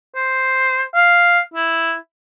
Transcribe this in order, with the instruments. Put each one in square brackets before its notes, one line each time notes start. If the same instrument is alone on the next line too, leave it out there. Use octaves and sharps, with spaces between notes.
[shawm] C5
F5
E4